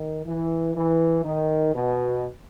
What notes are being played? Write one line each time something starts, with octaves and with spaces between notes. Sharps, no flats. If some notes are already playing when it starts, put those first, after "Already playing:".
Already playing: D#3
E3
E3
D#3
B2